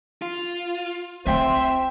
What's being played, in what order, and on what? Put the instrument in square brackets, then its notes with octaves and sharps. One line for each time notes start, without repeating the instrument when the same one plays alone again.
[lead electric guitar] F4
[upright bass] C4 F4 [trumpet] C5 [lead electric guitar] E5 [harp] G5 B6